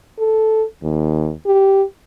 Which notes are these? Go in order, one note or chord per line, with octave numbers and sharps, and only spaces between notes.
A4
D#2
G4